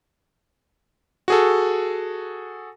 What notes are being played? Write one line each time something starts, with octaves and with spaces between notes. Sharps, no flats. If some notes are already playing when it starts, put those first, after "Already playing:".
F#4 G#4 A4